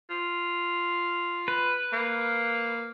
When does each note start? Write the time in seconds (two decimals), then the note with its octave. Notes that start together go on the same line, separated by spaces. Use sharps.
0.10 F4
1.48 B4
1.92 A#3